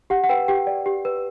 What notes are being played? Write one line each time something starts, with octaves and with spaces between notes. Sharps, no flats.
G4 F#5
F#5
B4 G5
G4 G5
D5
G4
B4